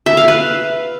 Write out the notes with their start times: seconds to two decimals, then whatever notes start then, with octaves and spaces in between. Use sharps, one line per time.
0.06 E5
0.17 F5
0.28 B4